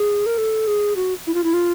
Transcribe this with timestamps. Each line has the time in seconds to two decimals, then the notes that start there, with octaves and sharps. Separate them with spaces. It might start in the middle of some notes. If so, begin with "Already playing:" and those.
Already playing: G#4
0.26 A#4
0.38 A4
0.67 G#4
0.96 F#4
1.27 E4
1.34 F4
1.44 E4
1.53 F4